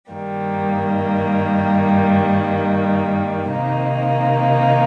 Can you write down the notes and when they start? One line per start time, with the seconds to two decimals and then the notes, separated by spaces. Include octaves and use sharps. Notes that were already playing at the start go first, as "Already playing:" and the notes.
0.12 G2 D#3 G3 A#3
3.52 C3 D#3 A#3 D#4